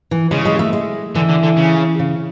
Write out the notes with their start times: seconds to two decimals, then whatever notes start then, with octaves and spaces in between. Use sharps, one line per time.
0.11 E3
0.31 C#3 G#3
0.45 G#3
0.59 A3
0.73 G#3
1.15 D3 E3
1.29 D3
1.43 D3
1.57 C#3
1.99 C#3